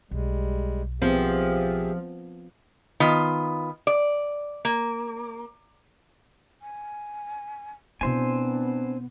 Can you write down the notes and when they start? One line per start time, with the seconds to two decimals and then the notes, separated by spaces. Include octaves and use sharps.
0.11 B1 G3 G#3
1.02 F3 B3 C4 G4 G#4 E5
3.00 D#3 B3 F4
3.87 D5
4.65 A#3
6.62 G#5
8.01 B2 B3 C4 D4 E4 C5 G#5